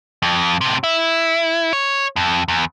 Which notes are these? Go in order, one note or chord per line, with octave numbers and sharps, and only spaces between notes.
F2
A2 C3
E4
C#5
F2
E2